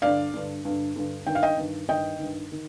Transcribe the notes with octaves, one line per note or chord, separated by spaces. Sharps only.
G2 D3 D5 F5
G2 D3
G2 D3
G2 D3
G2 D#3 G5
F5
D#5 G5
G2 D#3
G2 D#3 D#5 G5
G2 D#3
D#3